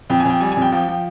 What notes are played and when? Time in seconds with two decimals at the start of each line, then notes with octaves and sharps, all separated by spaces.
0.10 F2 G5
0.20 G#5
0.25 F2 G5
0.41 G3 G#5
0.52 G#5
0.57 F2
0.62 G5
0.72 F3 G5
0.88 F3 G5